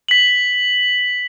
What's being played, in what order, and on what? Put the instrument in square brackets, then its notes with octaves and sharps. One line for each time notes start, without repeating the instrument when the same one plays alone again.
[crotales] B6 F#7